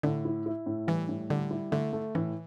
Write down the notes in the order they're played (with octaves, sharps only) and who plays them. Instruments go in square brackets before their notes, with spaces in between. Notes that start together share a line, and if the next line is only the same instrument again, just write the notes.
[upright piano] A2 [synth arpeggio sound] D3
[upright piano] E4
E4
A2
[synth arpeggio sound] E3 [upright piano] G3
[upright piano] A2
[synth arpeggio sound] D3 [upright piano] G3
[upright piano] E4
[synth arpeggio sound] D3 [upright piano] A3
[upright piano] A3
[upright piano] A2 [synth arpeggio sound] E3